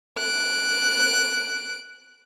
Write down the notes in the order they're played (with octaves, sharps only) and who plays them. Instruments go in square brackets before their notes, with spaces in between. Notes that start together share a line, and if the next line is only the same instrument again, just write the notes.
[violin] F#6 D7